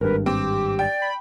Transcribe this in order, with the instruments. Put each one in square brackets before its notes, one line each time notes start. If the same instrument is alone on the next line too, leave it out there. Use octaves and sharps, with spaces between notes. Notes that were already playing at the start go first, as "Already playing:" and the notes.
[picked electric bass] G#1 G2 [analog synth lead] A#4 [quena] B4
[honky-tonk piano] C4 [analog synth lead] G4 [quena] D6
[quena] D5 [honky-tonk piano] G5
[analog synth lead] B5